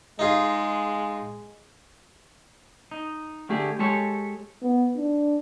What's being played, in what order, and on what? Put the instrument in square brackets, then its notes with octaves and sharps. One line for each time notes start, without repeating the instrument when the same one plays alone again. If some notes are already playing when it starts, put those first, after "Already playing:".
[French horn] G#3 [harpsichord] D#4 F4 G#4
[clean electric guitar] D#4
D3 A3 G4 G#4
G#3 G4 A4 C#5
[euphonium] B3
D4